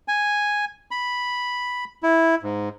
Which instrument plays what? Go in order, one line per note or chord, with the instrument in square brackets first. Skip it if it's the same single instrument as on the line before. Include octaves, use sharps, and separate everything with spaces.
[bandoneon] G#5
B5
E4
G#2